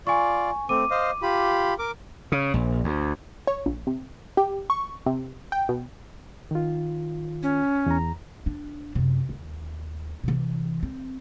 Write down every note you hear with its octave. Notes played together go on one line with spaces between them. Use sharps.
F4 D5 G#5 C#6
A3 C4 D6 D#7
C5 D#5 F5
F4 G4 B5
A#4 D6
C#3
A#1
D2
C#5
A#1
C3
G4
C#6
C3
G5
B2
D#3 F4
C#4
E2 A#5
D4
F#2 C3
D#2
C3 E3
C4